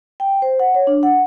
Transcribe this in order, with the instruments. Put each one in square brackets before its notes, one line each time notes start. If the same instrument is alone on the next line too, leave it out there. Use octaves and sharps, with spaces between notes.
[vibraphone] G5
C5
F#5
C#5
D4
F#5